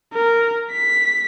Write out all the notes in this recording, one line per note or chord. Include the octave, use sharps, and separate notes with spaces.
A#4
B6